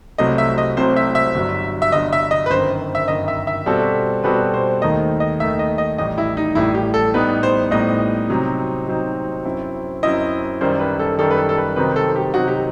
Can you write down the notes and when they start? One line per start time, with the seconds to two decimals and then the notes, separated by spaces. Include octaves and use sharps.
0.18 C2 C3 F#3 A3 C4 D#5
0.38 E5
0.58 D#5
0.77 C2 C3 F#3 A3 C4 C5
0.96 E5
1.15 E5
1.35 G1 G2 F#3
1.82 E5
1.92 G1 G2 F#3 D#5
2.13 E5
2.31 D#5
2.46 B4
2.51 G1 F#2 D#3 C5
2.95 E5
3.08 G1 F#2 D#3 D#5
3.28 E5
3.47 E5
3.66 B2 G3 C4 F#4 A4
4.24 B2 G3 C4 F#4 A4 B4
4.54 C5
4.82 D#2 D#3 A3 D#4 D#5
5.20 D#5
5.39 D#2 D#3 A3 D#4 E5
5.59 D#5
5.78 D#5
5.98 A1 A2 G3 D#5
6.18 E4
6.37 D#4
6.55 A1 A2 G3 E4
6.74 G4
6.94 A4
7.14 A2 G3 B3 D#4 B4
7.43 C5
7.71 A2 G3 B3 D#4 D#5
8.30 C3 F#3 C4 D#4
8.87 C3 F#3 C4 D#4
9.45 F#2 F#3 C4 E4
10.03 F#2 F#3 C4 E4 D#5
10.61 F#2 D#3 G3 C5
10.79 B4
10.99 A4
11.19 F#2 D#3 G3 A4
11.31 B4
11.37 A4
11.49 A4
11.57 B4
11.76 C3 D#3 F#3 C4 D#4 B4
11.96 A4
12.16 G4
12.34 C3 D#3 F#3 C4 D#4 F#4
12.48 G4